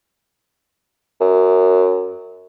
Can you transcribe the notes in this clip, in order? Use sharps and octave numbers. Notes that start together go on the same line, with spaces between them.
F#2